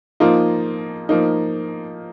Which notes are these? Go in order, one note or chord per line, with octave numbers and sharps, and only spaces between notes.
F3 A#3 D#4 F4
F3 A#3 D#4